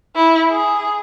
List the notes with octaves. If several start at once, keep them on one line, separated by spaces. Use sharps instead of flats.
E4
G#4